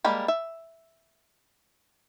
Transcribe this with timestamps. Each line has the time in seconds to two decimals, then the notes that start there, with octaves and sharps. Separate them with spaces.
0.04 G3 G#3 A#3 B5
0.28 E5